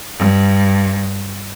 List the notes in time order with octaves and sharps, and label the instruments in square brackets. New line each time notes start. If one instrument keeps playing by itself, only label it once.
[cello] G2